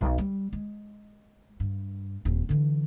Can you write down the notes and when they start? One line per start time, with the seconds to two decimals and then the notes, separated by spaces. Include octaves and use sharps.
0.01 B1
0.18 G3
0.53 G#3
1.60 G2
2.25 D#1 C4
2.49 D3 E3